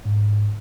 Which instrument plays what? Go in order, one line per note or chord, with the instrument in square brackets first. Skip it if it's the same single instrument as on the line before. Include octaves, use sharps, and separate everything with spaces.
[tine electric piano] G#2